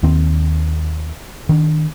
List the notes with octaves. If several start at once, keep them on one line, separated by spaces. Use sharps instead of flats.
D#2 D#3 C4
D#3 D4